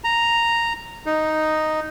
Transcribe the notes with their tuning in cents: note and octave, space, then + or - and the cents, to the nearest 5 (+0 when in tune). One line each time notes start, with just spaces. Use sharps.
A#5 -5
D#4 +0